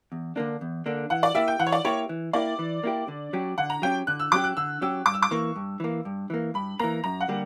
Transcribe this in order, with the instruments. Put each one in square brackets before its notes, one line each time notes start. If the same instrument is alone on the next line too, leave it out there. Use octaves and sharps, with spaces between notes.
[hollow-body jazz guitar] E2
D3 A#3 D4
E2
D3 A#3 D4
[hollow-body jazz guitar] E3 [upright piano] F#5
[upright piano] D5
[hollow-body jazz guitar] A#3 E4 G4 [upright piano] E5
[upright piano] G5
[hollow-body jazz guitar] E3 [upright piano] F#5
[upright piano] C#5
D5
[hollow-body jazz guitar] A#3 E4 G4 [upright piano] C#5
[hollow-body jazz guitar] E3
[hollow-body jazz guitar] A#3 E4 G4 [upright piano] D5
[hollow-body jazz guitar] E3
A#3 E4 G4
D3
F#3 C#4 G4
[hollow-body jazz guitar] D3 [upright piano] F#5
[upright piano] A#5
[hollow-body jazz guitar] F#3 C#4 G4 [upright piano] G5
[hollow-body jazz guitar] D3 [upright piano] F#6
[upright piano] E6
[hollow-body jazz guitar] F#3 C#4 G4 [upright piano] D6
[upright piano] F#6
[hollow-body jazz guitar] D3 [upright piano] E6
[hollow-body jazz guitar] F#3 C#4 G4 [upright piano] E6
[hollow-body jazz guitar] G2 [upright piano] D6
[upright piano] E6
D6
[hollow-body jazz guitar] E3 A#3 [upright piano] C#6
[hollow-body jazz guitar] G2
E3 A#3
G2
E3 A#3
[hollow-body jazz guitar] G2 [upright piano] B5
[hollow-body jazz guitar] E3 A#3 [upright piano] A#5
[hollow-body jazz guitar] F#2 [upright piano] A#5
[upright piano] F#5
[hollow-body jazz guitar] D3 G3 A#3